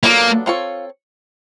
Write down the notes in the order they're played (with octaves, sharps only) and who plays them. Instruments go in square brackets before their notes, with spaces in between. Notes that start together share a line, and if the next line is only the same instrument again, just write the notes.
[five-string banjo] F#3 B3 D4 F4 A4 [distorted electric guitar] A#3
[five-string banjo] C4 F4 A4 C#5